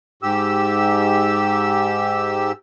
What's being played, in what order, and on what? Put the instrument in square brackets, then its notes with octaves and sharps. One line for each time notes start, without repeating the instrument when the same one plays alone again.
[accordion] G#2 G4 E6